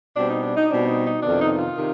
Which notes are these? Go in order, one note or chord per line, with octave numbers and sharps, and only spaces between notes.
B2 G3 C4 D4
D#4
D4
D#4
B2 G3 C4 D4
D#4
D#4
F2 C3 D#3 B3 D4
D#4
D#4
F4
C3 D#3